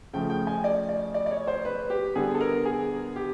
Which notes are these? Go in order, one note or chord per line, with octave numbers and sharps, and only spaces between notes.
C#3 F3 A3 G5
G5
G#5
D5
D5
D5
D5
C#5
C5
B4
G4
D3 G3 B3 G#4
A4
A#4
G#4
G4